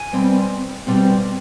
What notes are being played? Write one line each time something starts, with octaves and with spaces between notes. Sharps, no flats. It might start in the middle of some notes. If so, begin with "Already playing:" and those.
Already playing: G#5
B2 G3 C4
B2 G3 C4